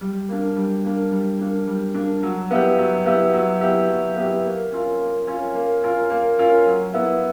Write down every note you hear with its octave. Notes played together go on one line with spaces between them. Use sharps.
G3
A#3 D4
G3
A#3 D4
G3
A#3 D4
G3
A#3 D4
F#3
B3 E4 G4
F#3
B3 E4 G4
F#3
B3 E4 G4
F#3
B3 E4 G4
A#3
C#4 F4 A#4
A#3
C#4 F4 A#4
A#3
C#4 F4 A#4
A#3
C#4 F4 A#4
F#3
B3 E4